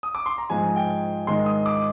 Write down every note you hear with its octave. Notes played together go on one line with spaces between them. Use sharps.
D#6
D6
C6
A#5
G#2 F3 G#3 G#5
G5
G#2 D#3 G#3 C6
D#6
D6